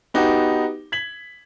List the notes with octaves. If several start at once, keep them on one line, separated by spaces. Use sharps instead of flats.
B3 D#4 F#4 G4
G#6 B6 F#7